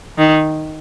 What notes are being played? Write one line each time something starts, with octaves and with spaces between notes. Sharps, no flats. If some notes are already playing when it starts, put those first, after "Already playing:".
D#3